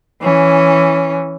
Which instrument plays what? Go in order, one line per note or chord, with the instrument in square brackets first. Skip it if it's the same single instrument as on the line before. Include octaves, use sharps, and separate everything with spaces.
[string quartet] E3 C#4